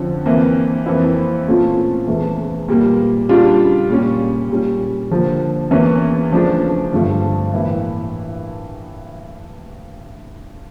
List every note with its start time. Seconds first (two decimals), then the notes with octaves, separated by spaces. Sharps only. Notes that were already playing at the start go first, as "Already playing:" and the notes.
Already playing: F2 D3 F3 C#4
0.26 F2 E3 A#3
0.86 F2 E3 A#3 E4
1.48 A#2 A3 C#4 F4
2.07 E2 C#3 E3 A3
2.68 A#2 G3 A#3
3.29 C#3 G3 D4 F4
3.90 A#2 G3 C#4
4.49 A#2 G3 C#4
5.11 D3 F3 A#3
5.71 E2 E3 A#3 C#4
6.31 C#3 F3 A3 D4
6.93 G2 D3 F3 A3
7.54 A2 E3 A#3 E4